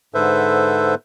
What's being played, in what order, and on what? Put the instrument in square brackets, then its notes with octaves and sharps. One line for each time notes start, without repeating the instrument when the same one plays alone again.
[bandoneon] G#2 D3 A4 B4 C5 E5